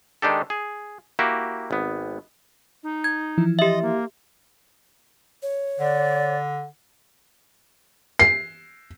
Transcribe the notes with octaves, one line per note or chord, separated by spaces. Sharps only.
D#3 G#3 D4 D#4 G4 A4
G#4
A#3 E4 F#4 G4
G#1 B3
D#4
G#6
E3 F3 E4
G4 D#5 E5
A#3
C#5
D3 D5
C7